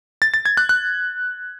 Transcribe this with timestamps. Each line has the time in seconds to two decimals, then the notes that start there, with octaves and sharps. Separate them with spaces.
0.22 A6
0.34 A6
0.45 G#6
0.57 F#6
0.69 F#6